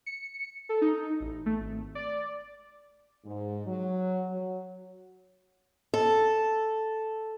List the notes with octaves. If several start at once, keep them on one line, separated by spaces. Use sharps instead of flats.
C#7
A4
D#4
A1
A3
G#1
D5
G#2
F#3
F#3
A4